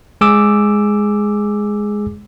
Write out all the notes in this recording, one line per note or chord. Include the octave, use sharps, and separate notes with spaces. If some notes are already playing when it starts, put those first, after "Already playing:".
G#3 G#4 D6 E6